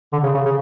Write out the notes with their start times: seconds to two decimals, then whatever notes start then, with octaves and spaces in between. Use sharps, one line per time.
0.13 D3
0.23 C#3
0.34 C#3
0.45 C#3